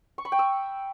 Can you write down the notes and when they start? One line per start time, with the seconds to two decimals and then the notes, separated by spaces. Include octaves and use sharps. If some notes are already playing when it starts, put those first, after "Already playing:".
0.18 C#6
0.25 B5
0.32 G5
0.39 E6